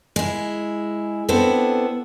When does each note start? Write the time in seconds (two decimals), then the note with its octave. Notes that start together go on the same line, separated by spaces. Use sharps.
0.16 G#3 E4
1.29 B3 C4 D4 E4 A4